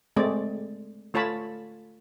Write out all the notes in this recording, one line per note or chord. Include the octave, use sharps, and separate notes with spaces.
G#3 A3 C4 D5
A3 F4 C#5 A5 B5